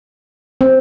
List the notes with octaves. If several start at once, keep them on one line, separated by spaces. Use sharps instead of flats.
C4